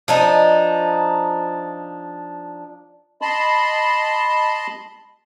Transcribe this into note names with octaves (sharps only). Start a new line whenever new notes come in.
F3 D4 D#4
D#5 A5 B5 C6